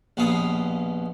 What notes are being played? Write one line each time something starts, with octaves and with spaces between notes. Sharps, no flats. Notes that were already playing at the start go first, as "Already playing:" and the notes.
A#1 D#2 B2 B3 F5 D#6